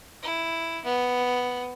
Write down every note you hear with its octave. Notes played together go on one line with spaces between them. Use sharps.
E4
B3